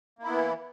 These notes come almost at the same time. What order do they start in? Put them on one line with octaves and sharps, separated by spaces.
A#3 E4 B3 E3